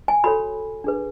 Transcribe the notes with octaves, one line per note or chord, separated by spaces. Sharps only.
G#5
F#4 A4 C#5 B5
D4 G#4 B4